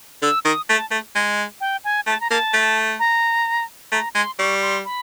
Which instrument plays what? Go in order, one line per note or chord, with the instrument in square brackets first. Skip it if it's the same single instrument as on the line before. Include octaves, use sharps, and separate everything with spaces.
[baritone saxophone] D3 [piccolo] E6
[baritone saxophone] D#3 [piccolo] D#6
[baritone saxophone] A3 [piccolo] A5
[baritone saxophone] A3
G#3
[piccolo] G5
G#5
[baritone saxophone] A3 [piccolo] A5
[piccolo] A#5
[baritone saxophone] A#3 [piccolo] A5
[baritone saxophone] A3
[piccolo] A#5
[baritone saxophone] A3 [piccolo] A#5
[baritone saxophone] G#3 [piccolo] C6
[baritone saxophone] G3 [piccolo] C#6
[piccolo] C6
B5